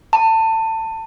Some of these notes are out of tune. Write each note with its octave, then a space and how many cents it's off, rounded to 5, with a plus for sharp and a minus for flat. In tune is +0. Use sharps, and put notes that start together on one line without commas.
A5 +25